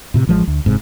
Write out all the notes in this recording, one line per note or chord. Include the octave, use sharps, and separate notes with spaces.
A2 C3
A1 F3 G#3
D2
F#1 G#2 C3